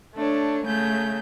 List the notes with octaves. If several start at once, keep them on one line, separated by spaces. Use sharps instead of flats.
A3 D4 C#5
C#3 A3 G6